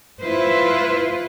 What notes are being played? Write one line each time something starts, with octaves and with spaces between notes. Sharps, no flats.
E4 F4 B4 C5